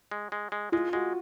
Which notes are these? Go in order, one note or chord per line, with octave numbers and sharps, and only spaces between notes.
G#3
G#3
G#3
G#3 F4
G#3 F#4